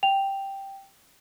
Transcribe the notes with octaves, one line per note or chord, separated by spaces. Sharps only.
G5 F7